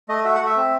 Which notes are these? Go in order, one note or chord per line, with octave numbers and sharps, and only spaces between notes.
A3 D#5
F#4 E5
F#5
A3
E5
C4